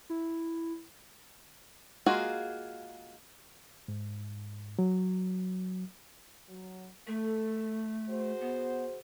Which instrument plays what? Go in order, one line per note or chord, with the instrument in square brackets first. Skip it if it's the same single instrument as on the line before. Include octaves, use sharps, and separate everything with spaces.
[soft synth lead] E4
[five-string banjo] G#3 A#3 F4 F#4 G#4
[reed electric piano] G#2
F#3
[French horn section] F#3
[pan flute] A3 [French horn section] A4
[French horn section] F#4 G#4 C5
[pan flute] B3